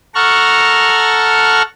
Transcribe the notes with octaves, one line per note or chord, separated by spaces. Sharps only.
A4 F#5 A#5 C#6 F6